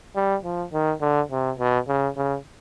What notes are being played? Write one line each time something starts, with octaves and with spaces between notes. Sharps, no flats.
G3
F3
D#3
D3
C3
B2
C#3
C#3